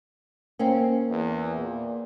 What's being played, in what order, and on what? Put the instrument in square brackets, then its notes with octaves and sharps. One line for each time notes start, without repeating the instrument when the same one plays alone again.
[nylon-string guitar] A#3 C4 C#4
[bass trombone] E2
A#2